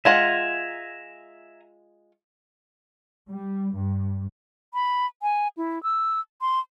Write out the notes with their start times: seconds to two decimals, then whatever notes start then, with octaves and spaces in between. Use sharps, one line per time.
0.05 G#3 F4 E5 F#5 G#5 A#5
3.29 G3
3.75 G2
4.74 B5
5.22 G#5
5.57 E4
5.83 E6
6.41 C6